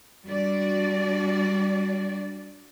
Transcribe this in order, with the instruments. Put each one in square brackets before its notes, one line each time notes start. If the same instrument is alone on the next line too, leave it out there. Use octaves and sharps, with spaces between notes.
[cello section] G3 D4 F#4 D5